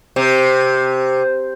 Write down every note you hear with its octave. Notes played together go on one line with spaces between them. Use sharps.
C3